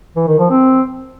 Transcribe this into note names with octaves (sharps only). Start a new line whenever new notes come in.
E3
D#3
F3
C4